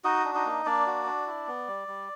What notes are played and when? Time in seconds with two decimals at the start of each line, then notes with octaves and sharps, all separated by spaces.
0.04 D#4 F#4 D#5
0.25 D4
0.35 D#4 D#5
0.46 A#3
0.66 A#3 D4 D5
0.86 F#4
1.06 D4
1.27 E4
1.48 B3
1.68 G3
1.88 G3